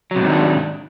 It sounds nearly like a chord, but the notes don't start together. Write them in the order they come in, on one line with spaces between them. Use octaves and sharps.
F#3 C3 G#2 D#3 D4